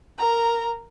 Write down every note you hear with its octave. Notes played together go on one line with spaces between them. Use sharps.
A#4 A#5